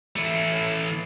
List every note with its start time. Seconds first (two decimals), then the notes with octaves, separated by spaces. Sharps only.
0.16 E3 A3